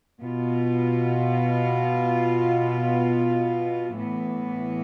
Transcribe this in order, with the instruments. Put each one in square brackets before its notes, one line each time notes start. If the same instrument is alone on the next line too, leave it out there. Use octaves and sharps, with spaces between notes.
[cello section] B2 B3 F4
A2 E3 B3